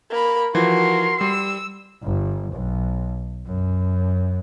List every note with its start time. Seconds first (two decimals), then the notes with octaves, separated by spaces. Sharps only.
0.10 A#3 B5
0.55 E3 F3 F#4 A#4 C6
1.21 G3 E6
2.03 G1
2.53 B1
3.46 F#2